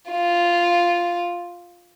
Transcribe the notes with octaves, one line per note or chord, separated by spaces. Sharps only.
F4